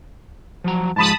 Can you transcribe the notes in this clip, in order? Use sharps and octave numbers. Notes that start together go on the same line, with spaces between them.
F3 F#3 A#5
G#2 F3 G#3 A5 B5 D#6